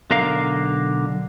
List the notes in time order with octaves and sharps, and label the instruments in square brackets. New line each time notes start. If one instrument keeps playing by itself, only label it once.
[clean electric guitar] B1 D3 A#4 F5